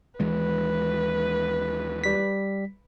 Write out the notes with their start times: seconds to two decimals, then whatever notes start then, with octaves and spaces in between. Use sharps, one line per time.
0.20 D#2 E3 G#3 B4
2.04 G3 B6